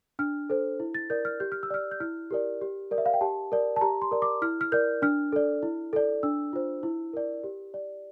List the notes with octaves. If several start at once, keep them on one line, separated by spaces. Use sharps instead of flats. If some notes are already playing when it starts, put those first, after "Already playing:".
D4 F6
A4 C5
E4
A6
A#4 D5 G6
F6
G4 G6
F6
E6
D5 F6
G6
E4 F6
G4 A#4 D5
G4
A#4 D5
E5
F5
G5
G4 A5
A#4 D5
A5
G4 A#5
C6
A#4 D5
D6
E4 F6
F6
A#4 D5 G6
D4 F6
A4 D5
E4
A4 D5
D4 E6
F4 C5
E4
A#4 D5
G4
D5